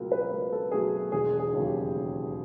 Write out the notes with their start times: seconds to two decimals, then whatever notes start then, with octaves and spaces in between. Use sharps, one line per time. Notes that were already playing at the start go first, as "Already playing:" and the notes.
Already playing: C#2 B2 F#3 A3 A#4
0.12 B4
0.31 C#2 A#4
0.52 A4
0.72 B2 F#3 A3 G#4
1.12 E1 G#4
1.40 G#4
1.53 D#2 C#3 F#3 A3
1.66 G4